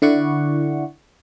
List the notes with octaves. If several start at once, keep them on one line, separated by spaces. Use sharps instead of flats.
D3 E4 D5 F#5 C#6